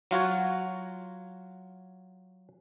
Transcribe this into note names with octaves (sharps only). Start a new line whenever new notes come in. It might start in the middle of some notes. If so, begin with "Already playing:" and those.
F#3 F4 F#4 C#5